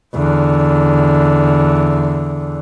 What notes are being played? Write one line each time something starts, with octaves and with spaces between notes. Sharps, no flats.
E2 D3